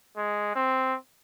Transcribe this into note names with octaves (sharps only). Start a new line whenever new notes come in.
G#3
C4